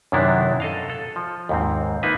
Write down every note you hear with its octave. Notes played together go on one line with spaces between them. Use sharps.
F#2 C3 D#3 B3 D4 E4
A4 D#5 F5
A4
F3
D#2 G#2 C4
A#3 D#4 F4 B4 E5